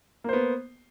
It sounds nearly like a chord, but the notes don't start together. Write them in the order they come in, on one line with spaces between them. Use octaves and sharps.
A#3 C5 B3